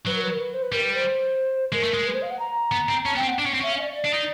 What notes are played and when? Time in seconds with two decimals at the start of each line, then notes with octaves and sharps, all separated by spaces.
0.06 F#3 B4
0.15 A#4
0.23 B4
0.31 A#4
0.40 B4
0.53 C5
0.62 B4
0.72 G3 A#4
0.84 B4
0.95 C5
1.72 G#3 A#4
1.83 A3
1.94 G#3
2.06 B4
2.14 C5
2.22 F5
2.31 F#5
2.39 A#5
2.72 B3
2.89 C4
3.05 C#4 A5
3.15 B3 G5
3.21 C4
3.27 F#5
3.39 D4
3.46 C#4
3.53 C4
3.61 C#4 E5
3.71 F5
3.78 D#5
3.82 D5
3.93 D5
4.04 D4
4.13 D#4